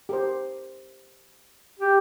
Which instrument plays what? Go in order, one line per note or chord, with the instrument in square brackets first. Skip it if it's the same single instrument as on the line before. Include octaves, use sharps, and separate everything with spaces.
[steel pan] G4 A#4 C5
[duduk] G4